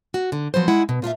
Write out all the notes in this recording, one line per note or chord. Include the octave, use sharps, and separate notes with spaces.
F#4
D3
F3 F#3 B3 C5
G#3 E4 F#5
B2
A#2 F4 A4 E5